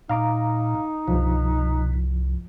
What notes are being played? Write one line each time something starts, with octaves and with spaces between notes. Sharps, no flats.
A#2 D#4 F5 A#5 D6
C2 G2 B2 F3